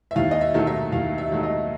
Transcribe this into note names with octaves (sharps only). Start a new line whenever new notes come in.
E5
D#2 F5
D#5
E5
D#3 F#3 A3
E5
D#2 F5
E5
D#3 F#3 A3
D#5